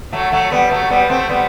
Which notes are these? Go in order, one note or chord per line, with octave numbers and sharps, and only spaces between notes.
F#3 A3
F#3 A3
G3 B3
F#3 A3
G3 B3
A3 C4
G3 B3